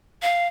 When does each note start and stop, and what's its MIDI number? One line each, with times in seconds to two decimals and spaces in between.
0.22 0.47 77